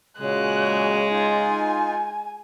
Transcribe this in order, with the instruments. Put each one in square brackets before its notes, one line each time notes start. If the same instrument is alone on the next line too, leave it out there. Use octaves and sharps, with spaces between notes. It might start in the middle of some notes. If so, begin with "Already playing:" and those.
[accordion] A#2 F#3 [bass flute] C#3 [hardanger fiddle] G#3 [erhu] F#6
[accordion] D#4 F4 [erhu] G#5